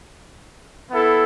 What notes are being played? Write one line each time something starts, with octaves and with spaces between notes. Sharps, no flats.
B3 E4 A4